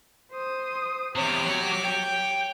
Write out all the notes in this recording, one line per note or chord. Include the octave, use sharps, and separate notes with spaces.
C5 D#6
E2 C3 G4 C#5 D6
F#3 F#5
G5